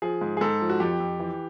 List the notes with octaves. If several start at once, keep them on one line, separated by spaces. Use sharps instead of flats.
F3 G#4
G#2
G#4
G#2 A4
F3
F#4
F2 G4
F2
E3